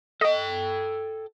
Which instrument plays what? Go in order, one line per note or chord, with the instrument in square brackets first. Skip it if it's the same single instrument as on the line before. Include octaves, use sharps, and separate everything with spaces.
[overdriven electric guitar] A4 G5 [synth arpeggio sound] D#5